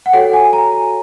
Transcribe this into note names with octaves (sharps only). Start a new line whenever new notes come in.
F#5
F#4 A4 C#5 G5
G#5
A#5